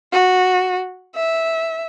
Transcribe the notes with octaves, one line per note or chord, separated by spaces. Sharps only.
F#4
E5